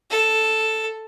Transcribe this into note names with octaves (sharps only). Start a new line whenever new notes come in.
A4